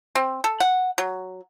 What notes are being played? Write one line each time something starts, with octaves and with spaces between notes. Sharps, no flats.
C4
A4
F#5
F#3